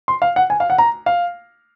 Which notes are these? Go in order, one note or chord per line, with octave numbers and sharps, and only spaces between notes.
C6
F5
F#5
G#5
F5
F#5
A#5
F5